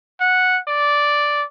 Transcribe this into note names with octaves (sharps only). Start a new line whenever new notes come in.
F#5
D5